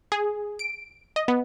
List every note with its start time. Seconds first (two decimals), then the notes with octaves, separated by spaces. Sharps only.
0.12 G#4
0.59 D7
1.16 D#5
1.28 B3